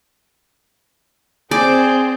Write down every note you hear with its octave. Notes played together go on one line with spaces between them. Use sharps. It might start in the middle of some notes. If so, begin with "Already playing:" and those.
C4 G#4 D5 G6